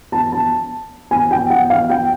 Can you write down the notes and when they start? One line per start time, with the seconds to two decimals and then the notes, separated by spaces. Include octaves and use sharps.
0.12 A5
0.32 A5
1.11 G#5
1.31 G5
1.50 F#5
1.70 F5
1.90 G5